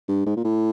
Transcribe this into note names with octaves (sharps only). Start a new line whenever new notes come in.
G2
G#2
A#2
A2